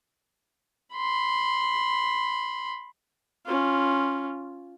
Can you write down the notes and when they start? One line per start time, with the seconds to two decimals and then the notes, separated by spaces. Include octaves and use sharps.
0.96 B5 C6
3.46 C#4 F4